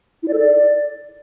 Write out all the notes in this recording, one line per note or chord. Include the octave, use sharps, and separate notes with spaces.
E4
D5
A4
D5